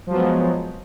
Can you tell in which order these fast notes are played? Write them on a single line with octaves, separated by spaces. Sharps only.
F3 F#3 B3 G#3